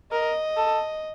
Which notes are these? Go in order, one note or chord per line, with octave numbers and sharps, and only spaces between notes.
A#4 D#5
A4